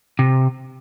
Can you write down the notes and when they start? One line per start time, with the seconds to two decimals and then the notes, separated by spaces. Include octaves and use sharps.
0.19 C3